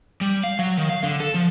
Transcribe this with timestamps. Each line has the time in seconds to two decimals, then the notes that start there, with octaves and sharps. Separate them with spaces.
0.21 G3
0.44 F5
0.59 F#3
0.77 D#3
0.89 F5
1.03 D3
1.20 A4
1.34 F3